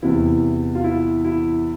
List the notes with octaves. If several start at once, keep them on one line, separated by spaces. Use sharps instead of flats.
E2 C3 E3 E4
F4
E4
E4